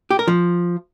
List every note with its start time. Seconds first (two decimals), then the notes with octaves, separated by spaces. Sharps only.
0.11 G4
0.19 A#4
0.28 F3